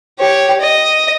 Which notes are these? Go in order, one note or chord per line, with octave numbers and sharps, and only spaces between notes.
G4 C#5
D#5